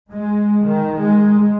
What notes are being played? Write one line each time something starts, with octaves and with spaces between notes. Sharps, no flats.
G#3
D#3
G#3